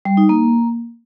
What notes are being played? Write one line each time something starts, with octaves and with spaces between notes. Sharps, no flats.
G3
D#4
A#3